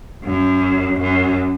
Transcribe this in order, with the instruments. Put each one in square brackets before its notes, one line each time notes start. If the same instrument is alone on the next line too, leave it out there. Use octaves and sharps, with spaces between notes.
[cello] F#2
F#2